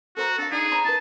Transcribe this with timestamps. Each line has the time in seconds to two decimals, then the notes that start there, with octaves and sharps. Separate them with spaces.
0.17 F#4 A4 C5 A#5
0.38 D4 A4 F5
0.51 D4 D#4 G#4 D5
0.72 C5 A#5 B5
0.85 E4 B4 A5